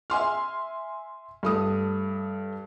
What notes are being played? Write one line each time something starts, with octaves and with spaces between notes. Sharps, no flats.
E5 G#5 C6 F6
G2 A3 D#6